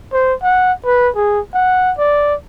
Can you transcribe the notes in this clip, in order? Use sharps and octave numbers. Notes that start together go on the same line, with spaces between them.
C5
F#5
B4
G#4
F#5
D5